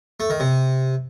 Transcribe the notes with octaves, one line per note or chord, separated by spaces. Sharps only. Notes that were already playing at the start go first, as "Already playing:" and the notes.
A3
D#3
C3